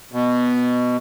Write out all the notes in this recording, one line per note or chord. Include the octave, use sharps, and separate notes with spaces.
B2